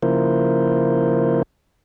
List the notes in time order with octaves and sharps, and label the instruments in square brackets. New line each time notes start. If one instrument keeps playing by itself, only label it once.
[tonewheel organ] C#3 F3 A#3 E4 A#4 C5